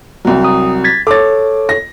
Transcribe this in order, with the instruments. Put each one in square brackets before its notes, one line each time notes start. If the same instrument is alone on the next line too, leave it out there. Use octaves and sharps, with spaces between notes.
[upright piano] C2 F#3
[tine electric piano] D#6
G#6 A6 B6
[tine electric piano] A4 C#5 [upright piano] D6 A6
[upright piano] A#6